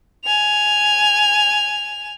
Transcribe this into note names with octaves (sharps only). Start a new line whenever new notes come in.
G#5 F7